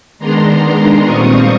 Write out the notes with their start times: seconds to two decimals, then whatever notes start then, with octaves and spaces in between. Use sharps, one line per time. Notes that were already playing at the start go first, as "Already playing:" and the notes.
0.18 D#3 G#3 B3 D4 A#5 C6
1.04 A#2 G3 C4 F4 C#6 D#6